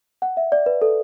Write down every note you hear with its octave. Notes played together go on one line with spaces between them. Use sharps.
F#5
E5
D5
B4
A4